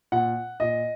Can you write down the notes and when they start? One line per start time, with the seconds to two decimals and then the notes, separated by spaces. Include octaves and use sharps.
0.12 A#2 F#5
0.60 A#2 D#5